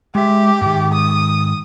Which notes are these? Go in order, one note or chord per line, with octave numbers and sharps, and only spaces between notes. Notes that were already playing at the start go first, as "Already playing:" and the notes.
G#3 G4 E5
G#2 D#3
D#6